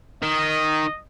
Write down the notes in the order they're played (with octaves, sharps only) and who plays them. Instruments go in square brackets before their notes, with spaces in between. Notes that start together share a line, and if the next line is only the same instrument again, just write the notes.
[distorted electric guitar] D#3 [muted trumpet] D#5